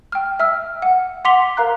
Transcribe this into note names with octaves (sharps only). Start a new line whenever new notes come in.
G5 F6
E5 E6 F6
F#5
F#5 C6 D6 B6 F7 G7
A#4 F5 A#5 F#6